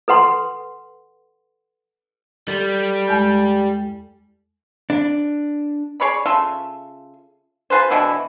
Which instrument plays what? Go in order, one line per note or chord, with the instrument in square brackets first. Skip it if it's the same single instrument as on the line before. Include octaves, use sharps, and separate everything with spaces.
[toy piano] A4 B4 F#5 C6
[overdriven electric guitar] G3 [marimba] A4
[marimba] E2 G#3 G6
[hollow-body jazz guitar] D4
[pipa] G#4 C#5 D5 B5
C#3 F4 A4 E5
F4 G#4 B4 C5
B2 D3 E3 E4